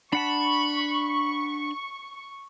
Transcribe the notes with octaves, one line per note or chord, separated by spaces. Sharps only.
D4 F#5 A5 B5 C#6